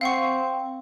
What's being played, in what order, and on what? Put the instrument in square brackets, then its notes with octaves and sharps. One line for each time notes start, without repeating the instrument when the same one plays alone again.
[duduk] C4 [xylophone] F5 F#5 C#6